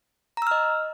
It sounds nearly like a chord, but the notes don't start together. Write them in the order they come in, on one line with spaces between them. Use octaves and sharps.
A#5 E6 F6 D#5